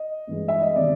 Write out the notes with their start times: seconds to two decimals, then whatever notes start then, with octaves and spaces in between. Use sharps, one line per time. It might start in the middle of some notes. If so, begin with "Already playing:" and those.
Already playing: D#5
0.27 G2 E3 G#3
0.48 E5
0.62 D#5
0.76 C3 D#3 G3 B3 D5